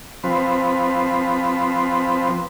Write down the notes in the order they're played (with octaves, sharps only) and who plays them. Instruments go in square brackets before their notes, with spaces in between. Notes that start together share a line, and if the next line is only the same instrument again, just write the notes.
[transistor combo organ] F3 C4 B4